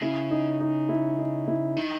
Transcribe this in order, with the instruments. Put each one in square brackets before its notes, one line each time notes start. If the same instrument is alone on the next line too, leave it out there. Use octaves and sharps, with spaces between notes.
[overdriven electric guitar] C#3 [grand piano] E4
[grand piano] D#4
D#4
E4
D#4
E4
[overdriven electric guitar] D#3 [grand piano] D#4